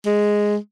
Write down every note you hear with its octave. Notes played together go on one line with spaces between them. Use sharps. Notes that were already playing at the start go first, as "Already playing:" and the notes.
G#3